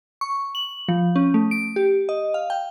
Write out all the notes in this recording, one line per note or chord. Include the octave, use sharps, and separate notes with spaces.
C#6
F#7
F3
C#4
A3
D7
G4
D#5
F5
G5